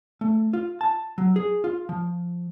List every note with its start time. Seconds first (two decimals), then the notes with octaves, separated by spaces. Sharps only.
0.21 A3
0.53 F4
0.81 A5
1.18 F#3
1.36 G#4
1.64 F4
1.89 F3